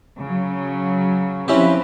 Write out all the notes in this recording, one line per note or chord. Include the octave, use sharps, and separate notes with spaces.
C#3 F#3
F3 C4 C#4 E4 G4 B4